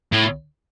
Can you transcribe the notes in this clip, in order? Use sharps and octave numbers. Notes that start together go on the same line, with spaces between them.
A2